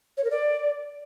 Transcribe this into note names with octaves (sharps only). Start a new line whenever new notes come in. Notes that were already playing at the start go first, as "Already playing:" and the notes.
C#5
A#4
D5